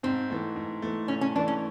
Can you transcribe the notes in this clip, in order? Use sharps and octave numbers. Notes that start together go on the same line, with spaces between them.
G#2 C4
E3 A3
G#2
E3 A3
G#2 C#4
C#4
E3 A3 D4
C#4